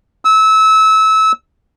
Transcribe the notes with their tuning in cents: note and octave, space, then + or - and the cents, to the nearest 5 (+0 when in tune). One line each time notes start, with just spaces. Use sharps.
E6 -25